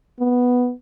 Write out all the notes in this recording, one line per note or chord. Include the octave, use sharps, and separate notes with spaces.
B3